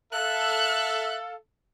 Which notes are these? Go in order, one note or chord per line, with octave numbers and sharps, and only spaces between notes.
A4 E5 F5 F#6